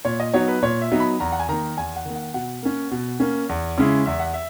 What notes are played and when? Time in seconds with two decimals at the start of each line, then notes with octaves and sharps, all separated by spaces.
0.05 A#2 C#5
0.20 D#5
0.34 F#3 B3 D#4 C#5
0.48 B4
0.62 A#2 C#5
0.82 E5
0.92 F#3 B3 D#4
1.00 B5
1.20 E2 A#5
1.32 F#5
1.39 G#5
1.49 D#3 A#3 A#5
1.77 E2 G#5
1.96 F#5
2.05 D#3 A#3
2.15 F#5
2.34 B2 F#5
2.63 A#3 C#4
2.91 B2
3.20 A#3 C#4
3.49 E2
3.78 C#3 G#3 C#4 E4
4.06 E2 E5
4.20 F#5
4.34 E5